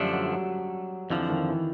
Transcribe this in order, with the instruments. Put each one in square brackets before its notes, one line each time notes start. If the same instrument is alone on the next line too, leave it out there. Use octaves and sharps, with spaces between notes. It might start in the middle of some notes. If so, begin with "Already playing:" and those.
Already playing: [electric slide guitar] F#2 D3 F3 A3 D4 [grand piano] G3
[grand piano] F#3
F#3
[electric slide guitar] F2 D3 F3 [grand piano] E3
[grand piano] D#3
E3